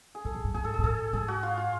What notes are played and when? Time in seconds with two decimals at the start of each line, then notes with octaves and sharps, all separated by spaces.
0.15 G#4
0.25 G#2 A4
0.34 A#2
0.44 G2
0.54 G#2 G#4
0.64 A4
0.74 G#2 G#4
0.83 A2 A4
1.13 G#2 G#4
1.28 F#4
1.43 F4
1.57 F4